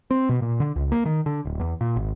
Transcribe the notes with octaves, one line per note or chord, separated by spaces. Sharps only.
C4
B2
A#2
D3
C#2
A#3
D#3
D3
D1
E2
A#2
G#1